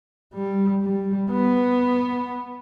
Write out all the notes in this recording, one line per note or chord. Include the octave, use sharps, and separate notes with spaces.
G3
G3
B3